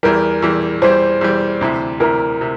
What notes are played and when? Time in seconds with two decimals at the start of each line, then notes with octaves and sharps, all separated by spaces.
0.03 E2 E3 G3 A#4
0.42 E2 E3 G3
0.82 E2 E3 G3 C5
1.21 E2 E3 G3
1.61 D2 C3 E3
2.00 D2 C3 E3 A#4
2.41 C3